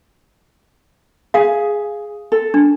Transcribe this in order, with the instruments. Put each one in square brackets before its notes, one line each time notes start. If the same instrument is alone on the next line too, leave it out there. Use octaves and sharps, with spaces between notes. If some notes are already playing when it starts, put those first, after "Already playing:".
[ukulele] G#4 [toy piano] F5
[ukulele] A4
[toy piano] D4